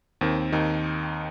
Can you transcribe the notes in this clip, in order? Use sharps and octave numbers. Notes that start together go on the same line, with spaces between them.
D#2 D#3 C4
D#2 D#3 D#4